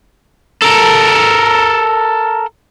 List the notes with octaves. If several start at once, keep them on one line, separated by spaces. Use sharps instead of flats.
A4 A#4